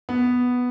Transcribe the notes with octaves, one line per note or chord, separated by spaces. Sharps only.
B3